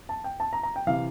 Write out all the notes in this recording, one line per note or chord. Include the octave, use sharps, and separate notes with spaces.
A5
G5
A5
A#5
A#5
G5
C3 E3 F5